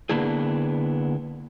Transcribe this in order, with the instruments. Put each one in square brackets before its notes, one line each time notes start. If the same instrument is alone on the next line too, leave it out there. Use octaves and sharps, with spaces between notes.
[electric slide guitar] D3 A#3 B3 D4 E4 G#4